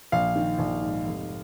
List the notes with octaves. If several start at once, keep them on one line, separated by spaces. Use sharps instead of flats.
A#1 F5
D#3
A#1
G#2
F1